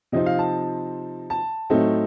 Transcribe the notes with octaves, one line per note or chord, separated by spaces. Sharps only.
C3 F3 C4 D#4 D#5
F5
A5
A5
A2 F#3 A3 C4 D#4